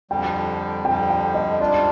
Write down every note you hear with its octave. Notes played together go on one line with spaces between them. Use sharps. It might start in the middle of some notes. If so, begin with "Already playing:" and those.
F2 D3 G3 G5
F2 D3 G3 G5
G5
D#5
G#2 G3 D4 F4 D5